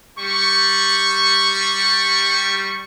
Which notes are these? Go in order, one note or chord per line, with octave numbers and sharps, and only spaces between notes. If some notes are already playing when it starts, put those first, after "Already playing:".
G3 C#6